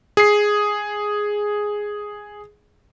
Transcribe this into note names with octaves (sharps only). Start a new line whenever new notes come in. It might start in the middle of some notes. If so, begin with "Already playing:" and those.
G#4 C7